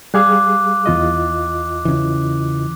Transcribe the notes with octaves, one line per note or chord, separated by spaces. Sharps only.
G3 G#4 F5 D6 F#6
E2 F4 D#5
C#3 E3